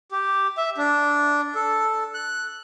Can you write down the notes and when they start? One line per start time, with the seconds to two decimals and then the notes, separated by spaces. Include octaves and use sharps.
0.11 G4
0.57 E5
0.78 D4
1.55 A4
2.14 F#6